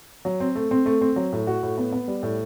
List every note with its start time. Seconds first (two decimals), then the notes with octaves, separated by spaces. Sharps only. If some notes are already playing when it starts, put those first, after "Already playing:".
0.25 F#3
0.40 C4
0.55 A3
0.71 C4
0.86 A3
1.01 C4
1.16 F#3
1.33 A2
1.47 F#4
1.63 A2
1.78 B3
1.93 B3
2.08 G3
2.23 A2